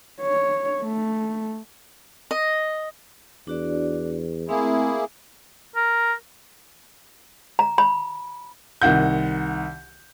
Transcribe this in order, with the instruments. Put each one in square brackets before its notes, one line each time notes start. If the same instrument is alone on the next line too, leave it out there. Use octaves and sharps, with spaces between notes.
[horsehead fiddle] C#5
A3
[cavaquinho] D#5
[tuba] E2 [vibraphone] D4 F#4 D5
[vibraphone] A3 C4 E5 [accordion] A#3 E4 G#4
[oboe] A#4
[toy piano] A#5
B5
[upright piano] C2 D#3 F#5 G6